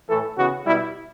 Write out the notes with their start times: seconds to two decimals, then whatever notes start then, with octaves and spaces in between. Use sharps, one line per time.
0.09 A2 E3 A3 A4
0.38 C#3 E3 B3 F#4
0.66 B2 G3 B3 E4